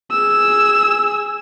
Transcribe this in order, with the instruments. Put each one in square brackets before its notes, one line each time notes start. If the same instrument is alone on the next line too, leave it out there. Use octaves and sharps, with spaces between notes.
[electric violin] G#4 E6